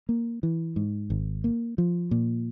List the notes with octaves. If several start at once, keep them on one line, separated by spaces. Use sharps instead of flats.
A#3
E3
G#2
G#1
A#3
F3
A#2